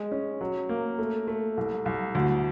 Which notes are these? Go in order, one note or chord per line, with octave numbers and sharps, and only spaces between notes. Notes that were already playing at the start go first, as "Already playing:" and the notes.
Already playing: G#3
C#4
F#3
A#3
A3
A3
C2
C2
D2